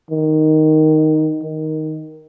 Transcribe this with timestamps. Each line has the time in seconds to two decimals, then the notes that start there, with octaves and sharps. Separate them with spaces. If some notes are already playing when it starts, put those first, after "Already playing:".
0.11 D#3
1.42 D#3